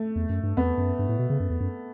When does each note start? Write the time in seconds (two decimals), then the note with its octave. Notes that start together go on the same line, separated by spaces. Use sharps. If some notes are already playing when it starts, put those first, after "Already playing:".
Already playing: A3
0.16 E2
0.29 F#2
0.43 G2
0.57 E2 B3
0.78 F#2
0.99 G2
1.09 A2
1.19 B2
1.30 C#3
1.40 F#2
1.50 E2
1.60 F#2